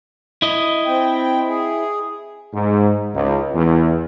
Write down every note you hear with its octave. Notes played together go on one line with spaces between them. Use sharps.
E4 D#5
C4 G5
G#4
G#2
C#2
E2